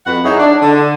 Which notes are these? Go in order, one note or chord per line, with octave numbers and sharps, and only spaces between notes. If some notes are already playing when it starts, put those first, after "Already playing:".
F2 B4 F#5
F#3 D#4 E4 G#4 C#5
D4
D3